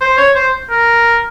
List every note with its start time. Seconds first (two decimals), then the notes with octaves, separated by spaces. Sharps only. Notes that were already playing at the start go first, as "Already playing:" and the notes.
0.01 C5
0.18 C#5
0.35 C5
0.70 A#4